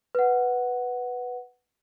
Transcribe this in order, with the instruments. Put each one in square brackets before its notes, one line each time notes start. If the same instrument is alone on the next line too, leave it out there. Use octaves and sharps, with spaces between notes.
[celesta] B4 F#5